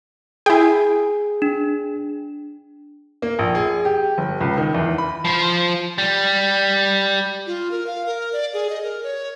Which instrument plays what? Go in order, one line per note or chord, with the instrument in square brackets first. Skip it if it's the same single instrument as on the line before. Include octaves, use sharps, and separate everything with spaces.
[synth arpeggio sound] E4 G5 [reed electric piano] G#4
[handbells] D4
[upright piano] A#3
A#1
G#4
G4
G1
C#2
D#3
E2
B5
[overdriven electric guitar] F3 C5
G3
[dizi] F4
A#4
F5
A#4
D5
G#4
D#5
A#4
C#5